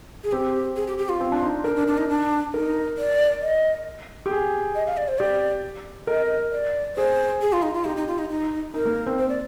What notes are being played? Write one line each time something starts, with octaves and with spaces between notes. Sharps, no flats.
G#4
C4 G4
G#4
G4
G4
F4
C4
D4
D#4
D4 A#4
D4
D4
D#4
D4
D#4 A#4
D5
D#5
G4
G#4
D#5
F5
D5
C5
G4 D5
A#4 D#5
D5
G#4 C5
G#4
F4
D#4
F4
D#4 G4
D#4
F4
D#4
D#4
D#4 A#4
A#3
C4
C5
D5